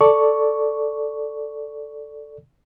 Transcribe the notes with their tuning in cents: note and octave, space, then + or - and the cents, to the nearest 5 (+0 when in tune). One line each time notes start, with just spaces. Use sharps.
A4 +0 D5 +0 C#6 +5